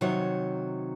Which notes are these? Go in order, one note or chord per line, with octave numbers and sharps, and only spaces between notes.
C3 D#3 F#3 C#5